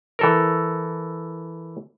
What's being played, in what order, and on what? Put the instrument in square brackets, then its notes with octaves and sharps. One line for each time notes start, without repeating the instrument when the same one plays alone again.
[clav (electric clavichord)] E3 A4 A#4